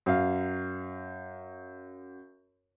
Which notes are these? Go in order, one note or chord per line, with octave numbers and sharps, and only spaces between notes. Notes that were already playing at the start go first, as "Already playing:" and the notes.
F#2 F5